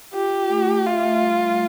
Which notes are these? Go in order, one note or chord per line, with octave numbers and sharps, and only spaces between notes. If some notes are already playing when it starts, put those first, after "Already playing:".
F4 G4
F4
A3
A3
F4 E5
A3
G3
G3